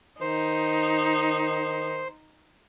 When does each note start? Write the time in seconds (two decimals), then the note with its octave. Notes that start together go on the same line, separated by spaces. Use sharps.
0.21 D#3 D#4 C5